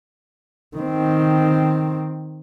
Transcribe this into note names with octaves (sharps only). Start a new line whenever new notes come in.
D#3 C4